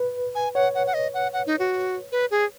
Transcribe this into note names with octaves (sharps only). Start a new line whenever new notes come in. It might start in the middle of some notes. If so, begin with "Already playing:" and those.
Already playing: B4
G#5
C#5 F#5
F#5
F#5
D#5
F#5
F#5
D#4
F#4
B4
G#4